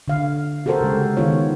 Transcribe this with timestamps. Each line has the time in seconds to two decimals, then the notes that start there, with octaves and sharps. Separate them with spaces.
0.08 D3 F5
0.66 F#4 G4 A4 A#4 C5
0.81 C#3 G#3
1.17 D#3 B3 F4 C#5